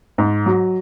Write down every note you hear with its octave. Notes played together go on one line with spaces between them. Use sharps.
G#2
F#3